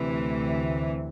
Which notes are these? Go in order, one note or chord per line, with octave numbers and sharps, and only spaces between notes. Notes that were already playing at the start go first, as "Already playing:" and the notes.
Already playing: D2 C3 E3